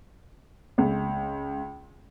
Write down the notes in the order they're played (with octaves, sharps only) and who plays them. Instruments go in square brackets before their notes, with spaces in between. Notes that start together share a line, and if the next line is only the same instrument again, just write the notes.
[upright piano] C#2